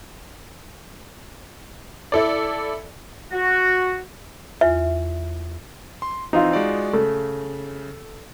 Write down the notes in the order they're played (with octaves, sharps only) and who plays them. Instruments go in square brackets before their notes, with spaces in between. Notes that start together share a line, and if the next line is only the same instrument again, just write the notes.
[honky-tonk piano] E4 A4 D5
[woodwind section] F#4
[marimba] E2 F4 [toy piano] E5
[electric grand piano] C6
[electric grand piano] E3 C4 [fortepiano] D#4 F4
[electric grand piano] G#3 F#4 D5
[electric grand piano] C#3 [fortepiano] A3